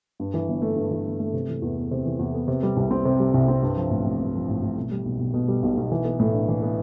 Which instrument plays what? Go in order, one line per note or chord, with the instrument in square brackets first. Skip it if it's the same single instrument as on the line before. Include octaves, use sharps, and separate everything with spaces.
[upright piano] G2
E3
G1
A3
G2
E3
G1
A3
C3
E3
E2
B3
C3
E3
E2
B3
C3
G3
C2
C4
C3
G3
C2
C4
G2
F3
A1
A1
G2
F3
A1
A1
B2
G3
B1
B1
B2
G3
B1
B1
E3
B3
A2
D4
E3
B3